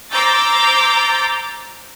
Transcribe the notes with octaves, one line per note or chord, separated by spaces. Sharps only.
C5 A#5 D6 E6 G6 A6